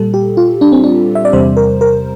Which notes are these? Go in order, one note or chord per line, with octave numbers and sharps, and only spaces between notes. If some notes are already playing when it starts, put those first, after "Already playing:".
Already playing: A#2 G3 A4
G4
F4
D4
C4
D4
E5
D5
E2 C3 G3 C5
A#4
A#4